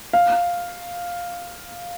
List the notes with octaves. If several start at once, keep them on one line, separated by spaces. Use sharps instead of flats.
F5